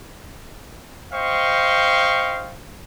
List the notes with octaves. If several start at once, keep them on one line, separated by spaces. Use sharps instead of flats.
C5 D#5 F5 G5 C#6